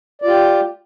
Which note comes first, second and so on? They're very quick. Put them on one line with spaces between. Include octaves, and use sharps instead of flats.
D5 F4 G4